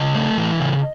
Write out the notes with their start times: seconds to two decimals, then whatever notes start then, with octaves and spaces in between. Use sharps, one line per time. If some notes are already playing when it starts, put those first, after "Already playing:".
Already playing: C#3 D#5
0.15 A3
0.38 E3
0.60 C#3